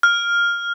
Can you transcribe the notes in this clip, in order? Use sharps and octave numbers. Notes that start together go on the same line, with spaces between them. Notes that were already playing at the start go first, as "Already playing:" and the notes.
F6